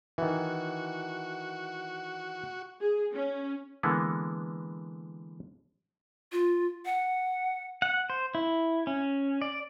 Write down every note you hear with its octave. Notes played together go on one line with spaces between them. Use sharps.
D#3 E3 F#4
G#4
C#4
D3 E3 G#3 A#3 B3
F4
F#5
F#5
C5
E4
C#4
D5